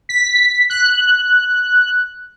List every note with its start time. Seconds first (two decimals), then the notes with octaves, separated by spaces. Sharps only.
0.09 B6
0.70 F#6